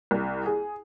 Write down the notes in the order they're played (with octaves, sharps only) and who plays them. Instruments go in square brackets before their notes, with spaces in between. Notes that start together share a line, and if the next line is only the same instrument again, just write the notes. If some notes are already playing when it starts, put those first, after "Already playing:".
[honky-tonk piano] C2
G#4